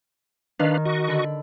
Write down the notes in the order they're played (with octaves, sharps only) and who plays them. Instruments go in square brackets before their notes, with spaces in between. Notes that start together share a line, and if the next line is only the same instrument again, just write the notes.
[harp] D#3 [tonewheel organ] D4 B4 F5
[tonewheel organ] F#4 D#5 C#6
[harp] D3 B5